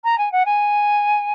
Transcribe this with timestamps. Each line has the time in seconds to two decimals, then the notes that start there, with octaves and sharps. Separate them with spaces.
0.04 A#5
0.18 G#5
0.32 F#5
0.46 G#5